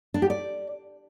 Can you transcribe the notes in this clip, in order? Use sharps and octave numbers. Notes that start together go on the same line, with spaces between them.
D4
G4
D5